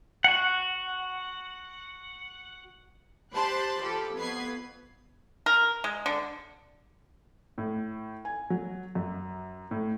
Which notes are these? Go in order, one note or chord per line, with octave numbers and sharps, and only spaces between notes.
F#4 F#5
G4 C5 A5 B5 C6 F#6
F3 G4 A4
F2 B3 B4 B5 G#6 C7
A#4
G#3
D3
A2
G#5
F#3
F#2
A2